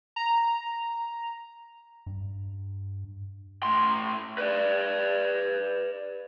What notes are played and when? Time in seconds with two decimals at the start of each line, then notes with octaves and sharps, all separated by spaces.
0.16 A#5
2.06 G2
3.63 A2 C6
4.38 B4 D5